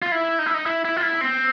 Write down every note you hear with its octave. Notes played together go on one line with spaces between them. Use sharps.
F4
E4
D#4
E4
D#4
E4
E4
F4
E4
C4